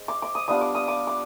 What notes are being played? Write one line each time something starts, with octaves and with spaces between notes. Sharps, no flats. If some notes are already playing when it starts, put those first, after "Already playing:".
Already playing: G#3 C4
D6
D6
D#6
G3 B3 D4 F4 D#6
D6
D#6
D6
D6